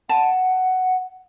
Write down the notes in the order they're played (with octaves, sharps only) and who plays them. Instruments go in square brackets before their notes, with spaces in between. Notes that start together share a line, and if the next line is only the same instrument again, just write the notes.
[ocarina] F#5 [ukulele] A5